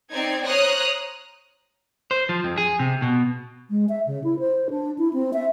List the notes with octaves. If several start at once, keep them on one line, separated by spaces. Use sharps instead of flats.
C4 D#4 D5 G#6
C5 C#5 A#5 D#6 F6 F#6
C5
F3
F2
G#4
C3
B2
G#3
E5
C#3
E4
C5
D4
E4
C4
E5